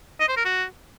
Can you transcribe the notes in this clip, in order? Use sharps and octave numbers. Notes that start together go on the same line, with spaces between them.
D#5
C5
A#4
F#4